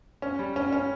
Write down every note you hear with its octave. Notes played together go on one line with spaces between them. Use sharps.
C#4
G3
C#4
C#4